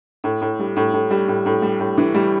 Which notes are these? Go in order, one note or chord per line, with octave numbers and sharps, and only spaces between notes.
A2
A2
G3
A2
A2
G3
A2
A2
G3
A2
E3
G3